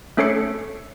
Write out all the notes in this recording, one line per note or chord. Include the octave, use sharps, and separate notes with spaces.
A3 C#4 A4 C#5 C7 C#7